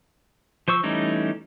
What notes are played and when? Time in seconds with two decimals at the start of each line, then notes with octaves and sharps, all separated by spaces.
0.68 F3 C5 C#6 E6
0.83 E3 G3 A3 C#4 D#4